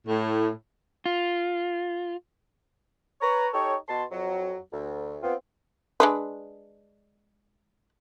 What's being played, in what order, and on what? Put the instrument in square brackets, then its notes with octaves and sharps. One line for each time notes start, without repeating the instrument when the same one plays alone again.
[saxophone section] A2
[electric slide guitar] F4
[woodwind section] B4 C#5 A#5
D#4 G4 A4 C#5
B2 A5 C6
F2 F#3
D2
B3 C4 F4
[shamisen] G#3 D4 B4